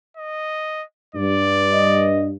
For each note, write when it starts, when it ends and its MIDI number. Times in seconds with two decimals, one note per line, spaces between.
0.17 0.84 75
1.15 2.35 43
1.15 2.11 74
1.73 2.26 75